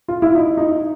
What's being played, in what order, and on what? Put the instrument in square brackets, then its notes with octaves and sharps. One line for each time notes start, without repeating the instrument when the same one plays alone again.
[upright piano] F4
E4
D#4
D#4